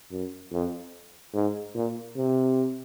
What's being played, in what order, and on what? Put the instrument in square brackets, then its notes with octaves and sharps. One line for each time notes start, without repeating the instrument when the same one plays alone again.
[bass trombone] F#2
F2
G#2
A#2
C3